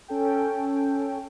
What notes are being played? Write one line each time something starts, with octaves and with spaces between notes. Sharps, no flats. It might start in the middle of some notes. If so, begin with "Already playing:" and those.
C#4 A4 G5